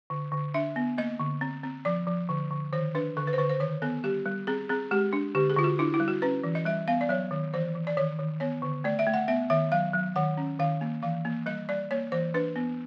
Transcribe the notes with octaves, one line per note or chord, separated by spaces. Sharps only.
D3
D3
D4 E5
B3
A#3 D#5
D3
C4
C4
F3 D5
F3
D3
D3
D#3 C5
D4 B4
D3 A4
B4
C5
D3 B4
C5
D#3 C#5
B3 A4
G3 G4
G3
C4 G#4
C4 G#4
G#3 G4
D4
D3 G4
G#4
D3 F4
F#4
D4 E4
E4
G3
F#4
C#4 B4
E3
D#5
G3 E5
B3 F5
D5
F#3 C#5
D#3
E3 C5
E3
D5
D#3 C#5
D#3
B3 C#5
D3
A3 D5
E5
A3
F#5
B3 E5
D#3 E5
F#3 F5
F#3
D#3 F#5
C#4
D#3 F5
A#3
E3 F5
A#3
G3 D#5
G3 D5
A#3 C#5
E3 C5
D4 B4
B3